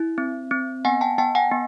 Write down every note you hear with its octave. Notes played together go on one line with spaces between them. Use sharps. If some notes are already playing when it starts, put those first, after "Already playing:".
Already playing: E4
C4
C4
B3 F#5 G#5
G5 A5
B3 G5 A5
F#5 G#5
B3